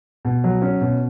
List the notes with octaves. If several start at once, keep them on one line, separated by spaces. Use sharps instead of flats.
B2
F#3
C#4
B2